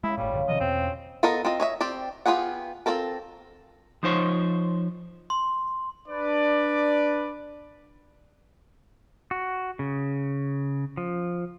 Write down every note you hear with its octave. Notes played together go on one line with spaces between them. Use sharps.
C#3 G#3 E4 G#5 C#6
G1 A2 G3 F4 C#5
A#1 G2 D3
C3 D#3 F3 D#5
E2 B2 C4
B3 F4 A4 A#4 D#5
C4 F4 D#5
C#5 D#5 E5
C4 G4 D5
B3 F4 G4 G#4 F#5
C4 C#4 F4 A4 A#4
F3 D#4 C5 C#5
C6
D4 B4 D5
F#4
C#3
F3